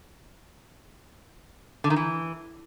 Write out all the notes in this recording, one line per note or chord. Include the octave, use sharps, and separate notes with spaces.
D3
D#3
E3